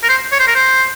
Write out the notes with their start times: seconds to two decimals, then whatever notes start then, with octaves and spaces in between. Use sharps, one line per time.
0.03 A#4
0.09 C5
0.32 C#5
0.40 C5
0.47 A#4
0.55 C5